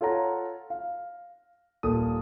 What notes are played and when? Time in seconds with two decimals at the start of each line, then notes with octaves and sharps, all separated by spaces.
0.01 F4 A4 C#5 F#5 A#5
0.70 F5
1.83 D#1 A#2 A4 D#6